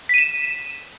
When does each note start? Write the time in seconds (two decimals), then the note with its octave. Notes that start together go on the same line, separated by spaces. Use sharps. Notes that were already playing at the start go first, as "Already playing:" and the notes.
0.09 B6
0.14 D#7
0.18 E7